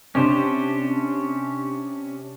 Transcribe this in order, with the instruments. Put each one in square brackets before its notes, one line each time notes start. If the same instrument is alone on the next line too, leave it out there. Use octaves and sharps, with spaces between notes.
[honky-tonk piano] C3 D4 [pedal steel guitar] C#4 G4 C5